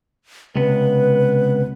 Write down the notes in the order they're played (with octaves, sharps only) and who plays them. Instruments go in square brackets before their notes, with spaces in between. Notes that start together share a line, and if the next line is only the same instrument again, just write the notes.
[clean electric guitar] C#2 C3 B3 [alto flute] B4